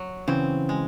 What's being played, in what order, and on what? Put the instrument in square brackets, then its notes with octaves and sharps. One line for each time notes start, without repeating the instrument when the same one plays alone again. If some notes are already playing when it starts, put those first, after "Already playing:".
Already playing: [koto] F#3
[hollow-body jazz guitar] C#3 E3 [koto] C4
[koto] G#3